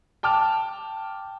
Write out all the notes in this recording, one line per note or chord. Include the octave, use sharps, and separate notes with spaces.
G5 A5 D6 F6